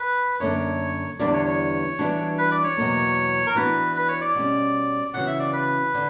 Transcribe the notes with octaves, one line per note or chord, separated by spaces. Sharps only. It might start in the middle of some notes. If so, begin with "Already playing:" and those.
Already playing: B4
F#2 D3 A#3 D4 C#5
E2 D3 G3 B3 D4 D5
C#5
C#5
E3 G3 B3 D4 F#4
B4
D5
C#5
E2 B2 F#3 A#3
A#4
E3 B3 D4 F#4 B4
B4
C#5
D5
B2 G3 C#4
C#3 E3 B3 F#4 F#5
E5
D5
B4
D3